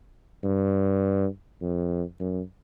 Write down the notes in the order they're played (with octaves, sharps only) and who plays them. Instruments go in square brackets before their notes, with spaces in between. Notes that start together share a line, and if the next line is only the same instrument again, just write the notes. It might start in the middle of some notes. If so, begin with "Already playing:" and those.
[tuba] G2
F2
F#2